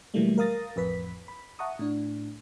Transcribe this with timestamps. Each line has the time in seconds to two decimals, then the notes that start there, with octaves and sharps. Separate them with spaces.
0.14 B2 E3 F#3 G3 A3 A#3
0.38 A#4 F5 D#6 A6 A#6
0.76 A1 F2 B4 B6
1.28 B5
1.59 E5 F#5 A5 A#5 C#6 D#6
1.79 A2 D4